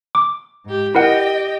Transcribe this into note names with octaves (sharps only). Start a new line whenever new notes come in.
D6
G#2 G4
E4 G4 A#4 D#5 F#5 G5